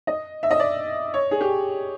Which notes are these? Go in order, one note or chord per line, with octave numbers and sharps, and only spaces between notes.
D#5
E5
D#5
D5
C#5
G#4
G4